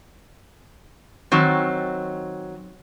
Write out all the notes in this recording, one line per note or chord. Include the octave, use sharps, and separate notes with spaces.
D#3 F#3 C4